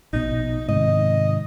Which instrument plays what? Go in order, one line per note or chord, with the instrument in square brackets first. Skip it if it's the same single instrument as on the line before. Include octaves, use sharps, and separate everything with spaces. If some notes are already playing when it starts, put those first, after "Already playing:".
[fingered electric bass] A#1 B2 [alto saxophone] D#4
[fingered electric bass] G#2 C3 D#3 [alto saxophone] D#5